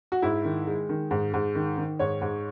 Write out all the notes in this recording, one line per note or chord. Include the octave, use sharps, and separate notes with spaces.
F#4
G#2 E4
D#3
G#3
D#3
G#2
G#2
D#3
D#3
G#2 C#5
G#2